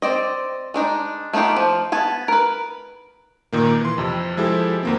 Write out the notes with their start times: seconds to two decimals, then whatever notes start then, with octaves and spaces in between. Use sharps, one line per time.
0.02 C4 D5 D#5
0.74 G#3 D4 D#4
1.33 A3 B3 D#4 F4 G4
1.57 F3
1.92 B3 G#5 A5
2.28 A#4 B4
3.53 A#2 D#3 A#3
3.81 E3 C6
3.98 F2 C3
4.37 F3 G#3 E4 G4 A4
4.83 D2 A#3 C4